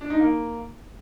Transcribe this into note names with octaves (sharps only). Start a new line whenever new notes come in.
D4
D#4
A#3